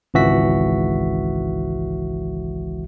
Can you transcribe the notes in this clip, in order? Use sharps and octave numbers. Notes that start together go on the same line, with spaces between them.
G#1 C#2 E3 F#4 E5 B6